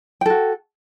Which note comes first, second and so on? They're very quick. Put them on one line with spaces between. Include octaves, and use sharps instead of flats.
G5 A4 F#4